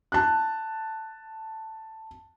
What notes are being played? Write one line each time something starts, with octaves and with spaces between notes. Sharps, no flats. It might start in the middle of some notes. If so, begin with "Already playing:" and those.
A5 F#6